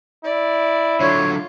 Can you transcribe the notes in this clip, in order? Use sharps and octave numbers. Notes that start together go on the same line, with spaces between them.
E4 D5
D3 F#3 F4 C#5